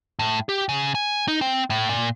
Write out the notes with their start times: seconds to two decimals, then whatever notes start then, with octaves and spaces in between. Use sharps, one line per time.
0.19 A2
0.49 G4
0.69 C#3
0.95 G#5
1.28 D#4
1.41 C4
1.70 A2
1.89 A#2